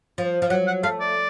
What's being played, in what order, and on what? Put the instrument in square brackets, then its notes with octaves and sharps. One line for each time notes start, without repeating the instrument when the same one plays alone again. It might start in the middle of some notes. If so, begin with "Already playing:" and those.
[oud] F3
F3
[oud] F#3 [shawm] F#5
[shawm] F#5
[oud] A3 [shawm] F5
[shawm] D5